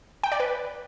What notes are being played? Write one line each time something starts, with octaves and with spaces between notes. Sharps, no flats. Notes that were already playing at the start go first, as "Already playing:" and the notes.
G5
D5
B4